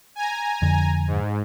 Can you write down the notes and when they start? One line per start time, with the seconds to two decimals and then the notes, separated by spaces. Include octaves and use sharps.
0.15 G#5 A#5
0.62 F2 D3
1.08 G#2